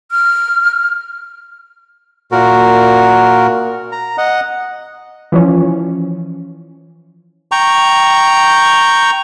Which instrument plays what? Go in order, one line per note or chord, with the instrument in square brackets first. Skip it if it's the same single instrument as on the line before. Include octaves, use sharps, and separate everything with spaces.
[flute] F6
[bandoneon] A#2 F#4 A#4
A#5
D#5 F#5
[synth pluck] E3 F3 C#4
[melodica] G5 A#5 C#6